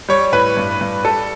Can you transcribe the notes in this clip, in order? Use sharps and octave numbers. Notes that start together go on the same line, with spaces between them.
G3 C#5
A2 B4
G2
G2
G3 A4